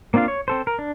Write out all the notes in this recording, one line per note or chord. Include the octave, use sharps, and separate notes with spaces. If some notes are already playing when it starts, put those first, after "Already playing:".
A#3 C4 D4 F4 F5
C#5
C4 A4 C5
A#4
D4